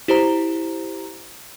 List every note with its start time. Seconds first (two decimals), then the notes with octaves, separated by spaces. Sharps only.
0.08 E4 G4 C5 A#5